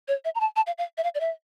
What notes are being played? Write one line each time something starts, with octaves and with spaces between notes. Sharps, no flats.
C#5
E5
A#5
A5
A5
F5
F5
E5
F5
D5
E5